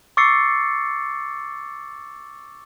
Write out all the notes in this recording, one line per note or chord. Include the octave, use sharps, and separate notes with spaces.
C#6 D6 E6 A6 C7 C#7